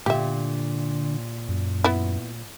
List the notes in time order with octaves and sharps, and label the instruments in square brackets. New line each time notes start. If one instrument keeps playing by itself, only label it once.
[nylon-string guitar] A#2 [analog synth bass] D3 [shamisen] G4 E5
[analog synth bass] F#2
[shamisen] B3 E4